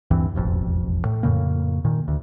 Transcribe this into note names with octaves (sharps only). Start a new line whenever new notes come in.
D2 G2 E3 C4
E1 A1 F2
A2
F2 A2 C#3 A#3
A#2 D#3
D2